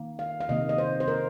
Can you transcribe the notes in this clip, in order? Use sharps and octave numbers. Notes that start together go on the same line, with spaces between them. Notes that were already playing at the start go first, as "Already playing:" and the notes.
Already playing: D#3 A#3
F5
F5
C3 D#3 A#3 D#5
D#5
C5
C5
A#4